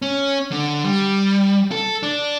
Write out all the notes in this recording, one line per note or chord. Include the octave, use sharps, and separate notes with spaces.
C#4
D3
G3
A4
D4